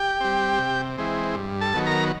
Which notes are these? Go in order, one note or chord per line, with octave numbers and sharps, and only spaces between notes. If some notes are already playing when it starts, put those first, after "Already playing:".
Already playing: G4 G5
G3 C4
C3
E3 G#3 C4
G2
A4 A5
D#3 F#3 B3
A#4 A#5